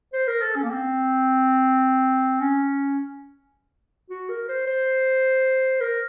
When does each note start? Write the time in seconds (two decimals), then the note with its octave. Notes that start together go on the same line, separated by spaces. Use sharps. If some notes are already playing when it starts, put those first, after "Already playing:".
0.13 C5
0.28 A#4
0.42 A4
0.55 C#4
0.63 A#3
0.70 C4
2.40 C#4
4.10 F#4
4.29 A#4
4.49 C5
4.67 C5
5.81 A#4